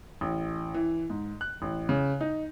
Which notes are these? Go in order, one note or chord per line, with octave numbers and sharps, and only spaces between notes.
A1
E3
G#2
F#6
A1
C#3
D#4